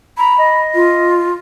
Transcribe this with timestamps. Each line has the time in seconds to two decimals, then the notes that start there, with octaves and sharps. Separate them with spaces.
0.18 A#5 B5
0.38 D#5
0.75 F4